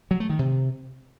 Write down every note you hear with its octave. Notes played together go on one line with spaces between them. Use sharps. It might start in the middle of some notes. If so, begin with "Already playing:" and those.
F#3
A3
D#3
C3